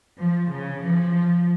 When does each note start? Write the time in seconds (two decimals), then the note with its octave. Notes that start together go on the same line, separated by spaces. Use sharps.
0.19 F3
0.51 C#3
0.82 F3